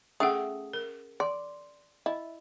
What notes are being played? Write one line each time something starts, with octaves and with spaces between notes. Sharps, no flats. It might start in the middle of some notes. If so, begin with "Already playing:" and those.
A3 C#4 G#4 E5 F#5 D#6
A#4
D5 C6
E4 D#5